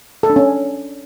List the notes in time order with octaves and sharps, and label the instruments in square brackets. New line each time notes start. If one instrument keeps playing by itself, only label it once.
[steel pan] A4
D4
C#4